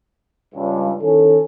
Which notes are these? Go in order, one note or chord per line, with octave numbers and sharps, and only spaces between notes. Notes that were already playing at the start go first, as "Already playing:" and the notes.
C#2 G2
D#3 C#4 E4 A4